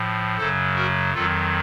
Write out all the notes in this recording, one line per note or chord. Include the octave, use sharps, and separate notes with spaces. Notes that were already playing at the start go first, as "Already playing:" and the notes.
Already playing: A2 F3
F#2 C#3 F#3 A4 C5
F#4 A#4
F2 D#3 F#3 F4 A4